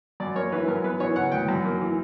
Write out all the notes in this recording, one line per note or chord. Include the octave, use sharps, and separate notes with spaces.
F#2 D5
A#3 C#5
E3 B4
F#2 A#4
B3 B4
E3 C#5
C#3 F#5
D2 G5
F#2
A#3
E3